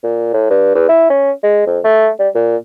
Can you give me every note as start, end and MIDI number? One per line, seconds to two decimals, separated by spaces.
0.04 0.32 46
0.34 0.46 45
0.50 0.73 43
0.75 0.88 40
0.89 1.07 64
1.10 1.31 61
1.43 1.64 56
1.66 1.79 41
1.84 2.09 57
2.19 2.29 55
2.35 2.57 46